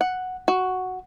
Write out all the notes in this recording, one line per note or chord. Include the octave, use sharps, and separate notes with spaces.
F#5
F#4